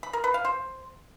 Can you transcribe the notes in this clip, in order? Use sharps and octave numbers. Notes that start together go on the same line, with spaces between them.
B5
A#4
B4
F5
C5